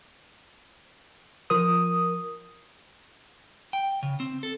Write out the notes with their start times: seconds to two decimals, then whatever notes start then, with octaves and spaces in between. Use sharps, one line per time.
1.50 F3 A#4 D#6
3.73 G5
4.03 C#3
4.20 C4
4.43 A4